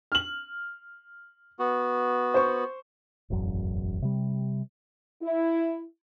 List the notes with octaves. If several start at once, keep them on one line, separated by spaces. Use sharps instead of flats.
F6 F#7
B3 F#4
C5 C#6
E1 A1 F#2
C3 G3
E4